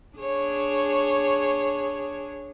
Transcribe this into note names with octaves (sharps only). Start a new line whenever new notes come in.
D4 G#4 C#5